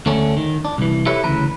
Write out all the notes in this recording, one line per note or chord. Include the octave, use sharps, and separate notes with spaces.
D2 D3 A3 C#4
D#3
D4
C2 E3
E4 G4 A4 B4 C#5 E5
D2 C#3 E3 B4 A#5